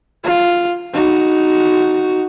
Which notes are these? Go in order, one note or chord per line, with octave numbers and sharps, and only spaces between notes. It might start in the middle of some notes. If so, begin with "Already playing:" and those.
F4
D#4 F#4